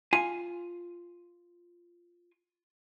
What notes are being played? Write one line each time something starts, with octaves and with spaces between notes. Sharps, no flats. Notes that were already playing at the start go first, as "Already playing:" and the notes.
F4 G#5